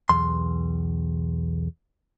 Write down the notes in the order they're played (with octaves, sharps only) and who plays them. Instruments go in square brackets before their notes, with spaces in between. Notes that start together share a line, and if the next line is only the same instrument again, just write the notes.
[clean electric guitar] B1 E2 C6